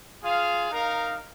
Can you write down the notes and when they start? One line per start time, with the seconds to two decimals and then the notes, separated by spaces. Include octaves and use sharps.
0.22 F4 G#4 F5
0.71 D#4 A#4 F5